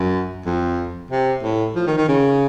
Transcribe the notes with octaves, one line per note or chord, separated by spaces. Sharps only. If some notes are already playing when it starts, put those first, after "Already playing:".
Already playing: F#2
F2
C3
A2
F3
D#3
D#3
C#3